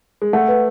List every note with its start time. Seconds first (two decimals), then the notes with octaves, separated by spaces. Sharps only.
0.22 G#3
0.33 A3 F#5
0.48 B4